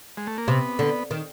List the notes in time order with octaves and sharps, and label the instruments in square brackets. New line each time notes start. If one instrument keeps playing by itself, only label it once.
[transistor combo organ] G#3
A3
A#3
[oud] C3 [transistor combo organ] B3
[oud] D3
D#3